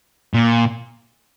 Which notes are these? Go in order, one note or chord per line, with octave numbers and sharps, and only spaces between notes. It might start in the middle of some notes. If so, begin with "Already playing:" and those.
A#2